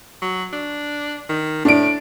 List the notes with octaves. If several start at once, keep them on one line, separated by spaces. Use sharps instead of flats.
F#3
D4
D#3
A2 D4 D7